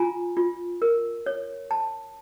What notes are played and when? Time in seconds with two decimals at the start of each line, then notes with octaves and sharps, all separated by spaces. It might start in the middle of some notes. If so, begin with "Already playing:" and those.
Already playing: F4 G#5 A#5
0.37 F4
0.82 A#4
1.26 C#5
1.71 A5